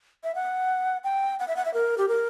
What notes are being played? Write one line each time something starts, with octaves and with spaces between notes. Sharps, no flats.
E5
F#5
G5
F#5
E5
F#5
E5
A#4
G4
A#4